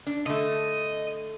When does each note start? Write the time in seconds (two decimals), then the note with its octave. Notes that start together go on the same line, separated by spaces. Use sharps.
0.07 D4
0.26 D3 A3 D#5